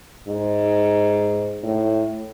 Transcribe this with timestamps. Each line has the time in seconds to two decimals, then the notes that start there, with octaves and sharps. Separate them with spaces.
0.28 G#2
1.64 A2